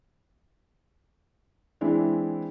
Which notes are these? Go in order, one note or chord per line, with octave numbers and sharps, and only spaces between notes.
E3 G#3 C4 D4 E4